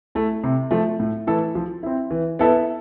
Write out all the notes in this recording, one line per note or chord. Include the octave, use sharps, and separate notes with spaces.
A3 E4
C3
F3 A3
A2
E3 A3 E4 A4
F3
C4 E4
E3
B3 E4 A4 E5